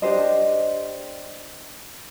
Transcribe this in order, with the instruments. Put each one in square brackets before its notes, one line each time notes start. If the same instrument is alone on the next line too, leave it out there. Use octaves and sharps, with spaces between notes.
[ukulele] D4 G4 C5 D#5